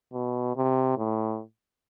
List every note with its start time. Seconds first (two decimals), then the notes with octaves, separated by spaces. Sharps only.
0.13 B2
0.56 C3
0.97 A2